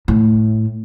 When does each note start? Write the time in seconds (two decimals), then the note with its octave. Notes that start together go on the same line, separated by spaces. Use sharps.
0.08 A2